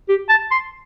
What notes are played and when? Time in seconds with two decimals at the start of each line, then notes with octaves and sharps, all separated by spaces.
0.09 G4
0.29 A5
0.51 C6